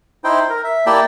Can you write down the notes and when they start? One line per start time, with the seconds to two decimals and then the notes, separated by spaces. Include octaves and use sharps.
0.24 D#4 E4 C5 G5
0.50 A#4
0.64 E5
0.86 A#3 E4 G4 D5 G5 A5